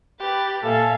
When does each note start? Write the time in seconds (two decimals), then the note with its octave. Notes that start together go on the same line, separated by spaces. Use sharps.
0.19 G4 B4 A6
0.63 A#2 A4 E5 F5 G#5